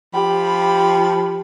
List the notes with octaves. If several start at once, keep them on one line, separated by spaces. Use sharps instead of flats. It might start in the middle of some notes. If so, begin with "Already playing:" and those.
F3 G4 B5